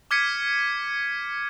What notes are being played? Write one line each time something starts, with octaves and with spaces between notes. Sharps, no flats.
D6 F6 G#6 B6 C#7 D#7